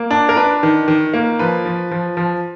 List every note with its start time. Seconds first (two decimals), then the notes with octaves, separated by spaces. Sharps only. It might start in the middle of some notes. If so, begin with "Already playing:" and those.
Already playing: A#3
0.11 D4
0.29 A#4
0.36 D4 B4
0.63 D#3
0.88 D#3
1.14 A#3
1.39 F3 B4
1.65 F3
1.91 F3
2.17 F3